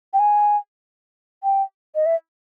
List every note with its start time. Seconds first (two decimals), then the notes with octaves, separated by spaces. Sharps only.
0.13 G5
0.19 G#5
1.44 G5
1.95 D#5
2.06 E5